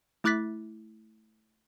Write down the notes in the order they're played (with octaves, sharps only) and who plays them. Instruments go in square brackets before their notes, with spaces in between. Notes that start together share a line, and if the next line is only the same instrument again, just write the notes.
[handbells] A3 E4 D6 F#6 A6 B6